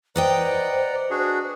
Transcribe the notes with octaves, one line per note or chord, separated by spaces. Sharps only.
B4 C5 D5 D#5 F#5 G5 A#5
D4 F#4 G#4